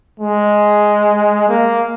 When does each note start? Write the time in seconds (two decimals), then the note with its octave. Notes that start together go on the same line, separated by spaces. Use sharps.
0.20 G#3
1.49 A#3